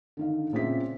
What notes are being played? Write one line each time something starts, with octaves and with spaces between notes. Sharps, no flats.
D3 D#3 F5
A#2 C#3 C4 E5 B6